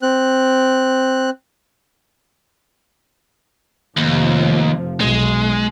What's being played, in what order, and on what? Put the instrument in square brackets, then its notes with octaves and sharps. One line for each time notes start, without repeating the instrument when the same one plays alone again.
[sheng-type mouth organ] C4 F#6
[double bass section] F1 C3 F3 [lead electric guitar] D#2
[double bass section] B1 [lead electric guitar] G#3